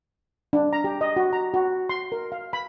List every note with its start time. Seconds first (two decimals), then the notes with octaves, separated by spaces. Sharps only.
0.53 D4
0.73 A#5
0.84 G4
1.01 D#5
1.16 F#4
1.33 A#5
1.54 F#4
1.89 C6
2.12 A#4
2.32 F5
2.53 B5